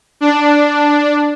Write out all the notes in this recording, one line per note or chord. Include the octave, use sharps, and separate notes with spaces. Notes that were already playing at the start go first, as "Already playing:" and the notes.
D4